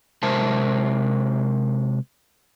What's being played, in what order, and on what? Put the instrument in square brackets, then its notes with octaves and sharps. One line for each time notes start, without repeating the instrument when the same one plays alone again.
[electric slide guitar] C3 G#3 A#4 C5 E5 A5